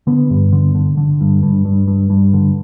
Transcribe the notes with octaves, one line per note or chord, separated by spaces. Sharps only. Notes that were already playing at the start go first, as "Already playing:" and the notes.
D3 B3
G2
D3
D3
D3
G2
G2
G2
G2
G2
D3